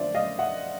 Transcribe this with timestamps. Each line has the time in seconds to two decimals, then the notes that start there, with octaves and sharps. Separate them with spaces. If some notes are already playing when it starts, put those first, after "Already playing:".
Already playing: F2 D3 F3 C5 D5 E5
0.15 D#5 F5
0.39 E5 F#5